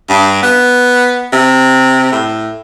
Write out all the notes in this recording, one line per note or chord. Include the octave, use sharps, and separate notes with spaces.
G2
B3
C3
A2